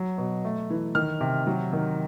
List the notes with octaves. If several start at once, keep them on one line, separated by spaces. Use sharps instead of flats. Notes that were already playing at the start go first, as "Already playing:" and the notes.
Already playing: F#3
B2
A3
E3
D#3 F6
C3
F#3
D#3